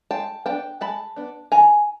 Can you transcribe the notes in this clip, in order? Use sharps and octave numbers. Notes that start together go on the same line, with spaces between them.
G#3 G5 A5
B3 D4 G5 A5
G#3 A5 B5
B3 D4
D#3 G#5 A#5